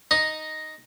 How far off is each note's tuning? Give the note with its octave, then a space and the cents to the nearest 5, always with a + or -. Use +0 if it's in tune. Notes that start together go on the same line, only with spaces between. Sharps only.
D#4 +0 D#5 +0